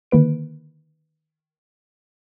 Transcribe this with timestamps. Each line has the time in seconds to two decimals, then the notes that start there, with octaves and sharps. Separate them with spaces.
0.11 D3 D#3 A#3 B4 D7